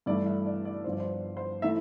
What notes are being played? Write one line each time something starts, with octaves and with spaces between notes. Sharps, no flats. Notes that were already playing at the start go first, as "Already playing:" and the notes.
G2 E3 A3 E4 D5
E5
D5
D5
G1 G2 F3 C5
D5
C5
C5
E3 A3 E4 E5